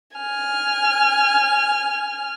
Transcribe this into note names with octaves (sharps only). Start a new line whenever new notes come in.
G#5 F6